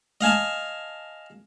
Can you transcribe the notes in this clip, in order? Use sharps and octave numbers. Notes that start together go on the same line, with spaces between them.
D#5 F5 G#5 A5